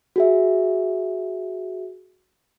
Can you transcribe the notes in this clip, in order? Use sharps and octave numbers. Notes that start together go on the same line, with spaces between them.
F#4 G#4 E5